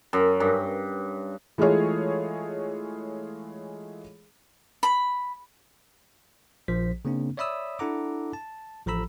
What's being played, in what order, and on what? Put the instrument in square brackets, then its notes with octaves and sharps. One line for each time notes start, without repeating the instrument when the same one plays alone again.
[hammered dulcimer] F#2
G2
[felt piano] E3 G#3 A3 F4 G#4 C#5
[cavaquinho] B5
[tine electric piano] A#1 F3 C5 B6
C#3 A#3 C4 D4
C#5 D5 E5 B5 D#6 E6
D4 E4 A4 F#5 A#5 D6
A5
A1 F3 A4 A#5 B5 E6